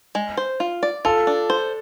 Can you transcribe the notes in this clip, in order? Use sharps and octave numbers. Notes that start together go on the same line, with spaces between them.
G#3
C5
F4
D5
F4 A4
D4
C5